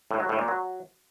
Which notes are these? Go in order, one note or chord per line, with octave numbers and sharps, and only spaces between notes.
A2
F#3
A2
A#2
F#3